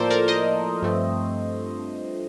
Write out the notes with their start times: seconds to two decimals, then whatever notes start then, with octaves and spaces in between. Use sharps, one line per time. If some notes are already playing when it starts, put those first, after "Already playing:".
Already playing: A2 F3 A#3 A4 A#4 C5 D5
0.10 A#4 D5
0.28 C5 D#5
0.82 G2 F3 A3 C4